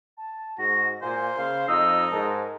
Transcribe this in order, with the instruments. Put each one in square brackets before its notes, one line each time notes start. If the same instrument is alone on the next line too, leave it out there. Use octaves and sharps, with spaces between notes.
[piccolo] A5
[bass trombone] G#2 [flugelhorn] F#4 [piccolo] A#6
[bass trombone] A#2 [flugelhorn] A#3 [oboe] C5 [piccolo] G#5
[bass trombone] C#3 [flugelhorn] F5 [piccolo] C6
[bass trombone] F2 [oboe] D#4 [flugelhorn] D#5 [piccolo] E6
[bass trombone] G#2 [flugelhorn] A#4 [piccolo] A5